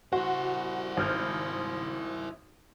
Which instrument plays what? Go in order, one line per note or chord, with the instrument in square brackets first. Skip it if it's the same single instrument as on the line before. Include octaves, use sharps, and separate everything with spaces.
[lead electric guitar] E4 C5 [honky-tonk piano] F#4
[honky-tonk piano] G#1 F6 G6